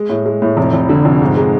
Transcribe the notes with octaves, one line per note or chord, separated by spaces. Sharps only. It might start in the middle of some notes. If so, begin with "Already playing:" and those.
Already playing: G#3
A2
G#3
A2
F1
F1
D3
F1
G#2
G#3